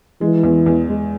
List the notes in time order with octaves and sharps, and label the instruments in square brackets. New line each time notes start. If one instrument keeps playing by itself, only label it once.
[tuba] E3 [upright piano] G#3
[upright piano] E2
E2
G#3